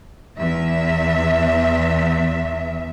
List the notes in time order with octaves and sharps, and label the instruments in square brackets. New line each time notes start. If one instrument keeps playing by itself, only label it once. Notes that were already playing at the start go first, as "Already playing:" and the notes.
[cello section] E2 E5